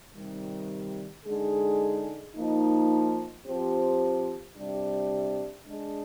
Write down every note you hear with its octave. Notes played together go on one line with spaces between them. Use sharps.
C3 D#3 G3
D3 G#3 D#4 G#4
F3 A#3 D#4
F3 C4 G4
C3 G3 D4 G4
G#3 D4 G#4